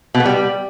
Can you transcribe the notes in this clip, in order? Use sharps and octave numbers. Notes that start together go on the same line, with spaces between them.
B2
B3
G3